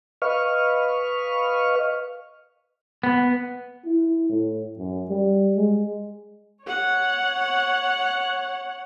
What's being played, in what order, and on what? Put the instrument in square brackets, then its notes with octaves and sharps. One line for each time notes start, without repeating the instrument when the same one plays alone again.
[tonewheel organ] B4 D#5 F5 C#6 F6
[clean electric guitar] B3
[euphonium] E4
A2
F#2
G3
G#3
[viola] C#5 F#5